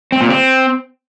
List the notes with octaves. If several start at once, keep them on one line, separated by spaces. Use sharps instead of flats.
C4
A#2
C4